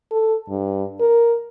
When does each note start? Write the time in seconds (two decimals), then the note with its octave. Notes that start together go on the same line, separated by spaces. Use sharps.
0.11 A4
0.49 G2
1.00 A#4